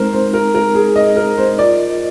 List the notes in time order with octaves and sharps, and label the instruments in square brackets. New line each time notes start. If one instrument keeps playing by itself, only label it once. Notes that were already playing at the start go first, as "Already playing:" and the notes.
Already playing: [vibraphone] G#3 C4 D#4 [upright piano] A#4 C5
[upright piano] C5
A#4
A#4
G#4
D#5
A#4
C5
[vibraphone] F4 A#4 D#5 [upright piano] D5